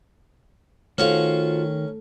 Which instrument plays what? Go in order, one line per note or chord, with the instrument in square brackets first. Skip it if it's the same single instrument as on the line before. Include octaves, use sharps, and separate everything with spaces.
[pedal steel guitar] D#3 [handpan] A3 A4 [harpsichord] C#4 C#6 [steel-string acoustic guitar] F4 F#4 C5